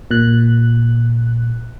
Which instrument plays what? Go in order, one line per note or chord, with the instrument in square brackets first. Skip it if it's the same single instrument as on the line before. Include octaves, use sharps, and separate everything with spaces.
[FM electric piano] A#2 F#6